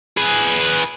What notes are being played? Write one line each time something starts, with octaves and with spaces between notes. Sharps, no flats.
G#4 B4